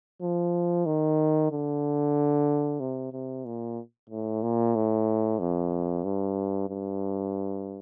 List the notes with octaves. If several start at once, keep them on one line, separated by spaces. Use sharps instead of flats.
F3
D#3
D3
C3
C3
A#2
A2
A#2
A2
F2
G2
G2